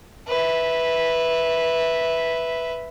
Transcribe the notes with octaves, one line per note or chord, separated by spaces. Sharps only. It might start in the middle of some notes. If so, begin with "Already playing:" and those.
B4 E5